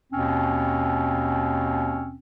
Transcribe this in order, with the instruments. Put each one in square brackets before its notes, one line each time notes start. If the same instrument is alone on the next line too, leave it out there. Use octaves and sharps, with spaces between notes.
[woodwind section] D#2 B2 C4 C#4